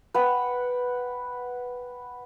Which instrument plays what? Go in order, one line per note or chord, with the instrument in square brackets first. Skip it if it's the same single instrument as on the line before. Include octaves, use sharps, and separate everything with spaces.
[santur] B4 F#5 G5